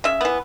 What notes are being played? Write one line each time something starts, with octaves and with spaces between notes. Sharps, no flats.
C#3 E5
E3 B3